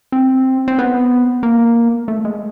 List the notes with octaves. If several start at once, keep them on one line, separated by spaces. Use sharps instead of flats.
C4
C4
B3
A#3
A3
G#3